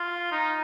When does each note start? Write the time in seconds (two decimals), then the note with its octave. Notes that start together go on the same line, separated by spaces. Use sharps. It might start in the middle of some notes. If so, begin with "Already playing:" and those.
Already playing: F4
0.32 D#4